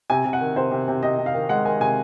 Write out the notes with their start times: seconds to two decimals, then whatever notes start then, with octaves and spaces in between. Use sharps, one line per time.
0.10 C3 G#5
0.25 C3
0.33 F#5
0.40 D#3
0.56 C3 C5
0.72 C3
0.88 C3
1.03 C3 D#5
1.18 C3
1.26 F5
1.34 D#3
1.49 G#3 F#5
1.65 D#3 G#5
1.80 C3 G#5